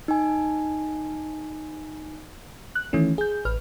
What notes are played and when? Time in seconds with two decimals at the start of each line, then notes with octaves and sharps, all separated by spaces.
0.08 D#4 G#5
2.75 F#6
2.93 D#3 E3 A3 C#4
3.18 G#4 G6
3.45 A1 B4 F6